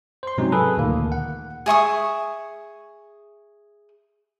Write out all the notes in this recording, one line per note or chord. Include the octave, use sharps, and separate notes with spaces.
C5 C6
G#2 C3 F#3 C#4 D#4
G#4 A4 B4
D2 A#2 D#3 A#3
F#5
G#4 E5 C#6 D#6